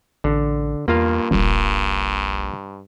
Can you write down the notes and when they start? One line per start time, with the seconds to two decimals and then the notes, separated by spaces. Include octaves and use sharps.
0.24 A1 D3
0.88 E2 G2 A#3 F4 F5
1.31 D#1 A#1 G2